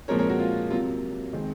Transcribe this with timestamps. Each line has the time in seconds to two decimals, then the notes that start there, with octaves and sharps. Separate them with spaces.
0.08 A#2 F3 G#3 C4 A#4 C#5
0.18 A#4 C#5
0.30 F#4 A#4
0.39 F4
0.70 C3 F#3 A#3 F4
1.33 D#3 G#3 C4